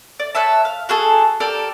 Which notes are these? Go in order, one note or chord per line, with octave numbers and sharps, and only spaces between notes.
D5
B4 C#5 E5 A5
F5
F#4 G#4 A4
G4 A4 A#4 D5